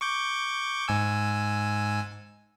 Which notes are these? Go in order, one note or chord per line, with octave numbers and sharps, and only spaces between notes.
C#6 D6 G6
G#2 G#5 E6